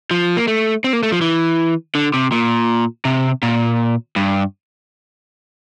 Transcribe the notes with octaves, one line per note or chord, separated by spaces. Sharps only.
F3
A#3
A3
C4
A#3
A3
F3
E3
D3
C3
A#2
C3
A#2
G2